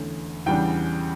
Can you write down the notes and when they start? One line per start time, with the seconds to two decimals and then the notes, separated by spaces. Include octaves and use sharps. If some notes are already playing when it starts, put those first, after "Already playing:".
Already playing: E2 D3 A3 C#4
0.46 E2 C#3 G3 D4 G5